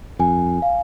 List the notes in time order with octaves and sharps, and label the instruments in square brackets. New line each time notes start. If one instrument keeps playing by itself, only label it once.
[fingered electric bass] F2 [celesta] G#5
[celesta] F5